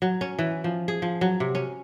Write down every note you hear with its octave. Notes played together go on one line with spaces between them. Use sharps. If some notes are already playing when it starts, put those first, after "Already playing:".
F#3
C#4
E3
F3
G#4
F3
F#3
C3
C#4